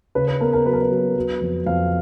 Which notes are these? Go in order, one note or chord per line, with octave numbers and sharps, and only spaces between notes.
C#3 B4
B4
B3 A#4
A#4
F#3 B4
A#4
B4
F#3
F#3
F2
F2 F5